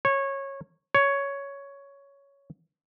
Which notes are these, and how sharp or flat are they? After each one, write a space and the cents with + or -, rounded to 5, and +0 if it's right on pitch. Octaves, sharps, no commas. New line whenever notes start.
C#5 -15
C#5 +10